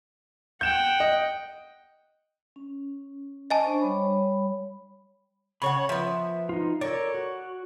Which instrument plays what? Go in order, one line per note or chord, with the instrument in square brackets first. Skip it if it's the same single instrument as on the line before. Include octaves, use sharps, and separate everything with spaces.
[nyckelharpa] F#5 G5 [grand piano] G6 E7
[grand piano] D#5
[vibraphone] C#4
[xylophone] D#5 G#5 A5
[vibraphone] D4 C5 C#6
G3 C#5 B5
[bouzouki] C#3 C#5 F#5 [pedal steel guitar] B5 C#6
[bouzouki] F3 B3 [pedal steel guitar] E5
[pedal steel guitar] D#4 F4
[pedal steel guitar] A4 A#4 D5 [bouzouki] C#5
[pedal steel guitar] F#4